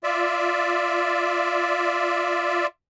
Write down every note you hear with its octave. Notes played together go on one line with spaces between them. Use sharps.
F4 D5 E5